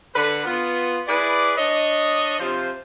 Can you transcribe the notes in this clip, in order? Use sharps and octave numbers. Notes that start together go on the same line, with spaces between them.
D3 B4
B3 F4
E4 G#4 B4 D5
D4 C#5 D#5
C3 F3 F4 C5